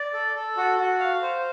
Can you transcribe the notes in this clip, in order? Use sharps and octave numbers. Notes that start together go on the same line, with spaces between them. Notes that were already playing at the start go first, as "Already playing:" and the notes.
Already playing: D5
A4
A4
F#4
F#4
F5
C5